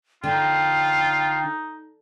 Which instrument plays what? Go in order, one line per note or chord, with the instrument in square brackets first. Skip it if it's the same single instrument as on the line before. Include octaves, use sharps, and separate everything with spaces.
[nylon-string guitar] D3 [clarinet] D#4 [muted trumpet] F4 [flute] G5